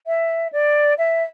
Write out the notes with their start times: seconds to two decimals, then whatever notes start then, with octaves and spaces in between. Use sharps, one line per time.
0.06 E5
0.52 D5
0.98 E5